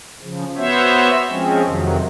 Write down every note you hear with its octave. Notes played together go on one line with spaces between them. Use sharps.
C#3 F3
B3 F#4 C5 C#5 E5
F3 G#3 C4 C#4
F2 C3 D#3 F#3